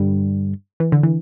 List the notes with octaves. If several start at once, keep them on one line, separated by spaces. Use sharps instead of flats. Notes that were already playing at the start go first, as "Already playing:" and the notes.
Already playing: G2 D3 G3
E3
D3
E3